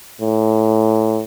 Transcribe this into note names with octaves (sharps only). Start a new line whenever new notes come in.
A2